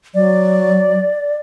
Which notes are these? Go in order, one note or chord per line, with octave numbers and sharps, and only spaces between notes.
F#3 D5